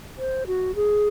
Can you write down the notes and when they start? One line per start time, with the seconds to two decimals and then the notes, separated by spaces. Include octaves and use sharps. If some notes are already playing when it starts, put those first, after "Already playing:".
0.18 C5
0.47 F#4
0.75 G#4